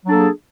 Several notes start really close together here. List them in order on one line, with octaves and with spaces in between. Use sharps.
F#3 D4 A4 A#3 G#4